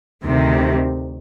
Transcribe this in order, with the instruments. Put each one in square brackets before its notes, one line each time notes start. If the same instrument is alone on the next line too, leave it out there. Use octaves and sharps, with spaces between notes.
[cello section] D2 C3 D#3